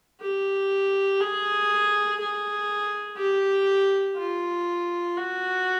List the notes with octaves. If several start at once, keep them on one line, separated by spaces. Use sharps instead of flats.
G4
G#4
G#4
G4
F4
F#4